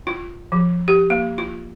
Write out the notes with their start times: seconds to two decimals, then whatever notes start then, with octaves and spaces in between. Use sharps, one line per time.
0.07 F4
0.52 F3
0.88 G4
1.10 A#3
1.38 F4